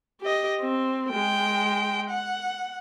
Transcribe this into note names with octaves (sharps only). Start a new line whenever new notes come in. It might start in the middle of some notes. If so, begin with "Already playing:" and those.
G4 D#5
C4
G#3 G5
F#5